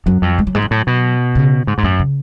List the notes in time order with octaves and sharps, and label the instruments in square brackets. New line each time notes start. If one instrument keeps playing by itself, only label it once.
[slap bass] F#2 [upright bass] F#3
[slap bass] F2
[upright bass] G#3
F#3
[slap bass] G#2 [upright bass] G#3
[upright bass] F#3
[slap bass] A2
B2
[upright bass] C#3
[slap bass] G#2
G#2
[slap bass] F#2 [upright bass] A2
[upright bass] C#3